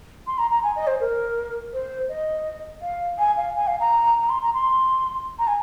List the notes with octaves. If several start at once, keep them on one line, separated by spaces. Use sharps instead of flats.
C6
A#5
A#5
G#5
D#5
C5
A#4
C5
D#5
F5
G#5
F5
G#5
F5
A#5
A#5
C6
A#5
C6
A#5
G#5